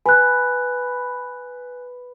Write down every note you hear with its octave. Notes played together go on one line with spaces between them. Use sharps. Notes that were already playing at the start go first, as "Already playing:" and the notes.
B4 G#5 F#6